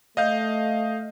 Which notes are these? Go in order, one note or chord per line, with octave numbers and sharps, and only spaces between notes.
A3 D#5 F5 G6